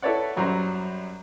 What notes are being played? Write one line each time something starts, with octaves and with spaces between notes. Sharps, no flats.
E4 A4 B4 C#5 D5 F#5
F#2 F#3 G3 C5 A#5